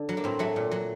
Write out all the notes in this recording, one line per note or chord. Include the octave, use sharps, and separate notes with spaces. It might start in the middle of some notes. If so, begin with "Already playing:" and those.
Already playing: D3
F#3
A#3
A2 C4
F#3 A3
A#2
F#3